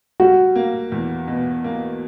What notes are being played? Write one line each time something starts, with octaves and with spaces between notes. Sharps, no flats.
G3 F#4
A#3
E2
B2
A#3